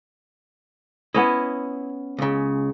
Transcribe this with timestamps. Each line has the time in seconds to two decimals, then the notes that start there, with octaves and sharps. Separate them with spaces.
1.14 B3 C#4 E4 D#5
2.18 C#2 C#3